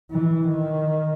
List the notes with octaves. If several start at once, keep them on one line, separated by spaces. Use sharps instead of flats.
E3
D#3